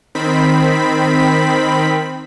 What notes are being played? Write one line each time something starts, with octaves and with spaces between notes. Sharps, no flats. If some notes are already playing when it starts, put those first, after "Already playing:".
D#3 C4 B5 B6